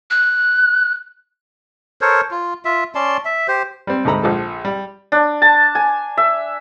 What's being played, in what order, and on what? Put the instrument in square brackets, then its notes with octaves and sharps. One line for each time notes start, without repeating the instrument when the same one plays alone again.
[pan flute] F#6
[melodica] A4 A#4 C5 C#5
F4
F4 E5
C#4 D5 A5 C6
E5
G4 C5
[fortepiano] G3 C4
D2 G#2 A4 A#5 B5
A#1 F3 A4
G3
[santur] D4
A5
G#5
E5